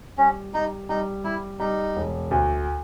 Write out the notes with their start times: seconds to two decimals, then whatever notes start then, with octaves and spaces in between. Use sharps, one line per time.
0.18 G3 C#4
0.53 G3 D#4
0.89 G3 D#4
1.24 G3 E4
1.59 G3 D#4
1.96 E1
2.31 D2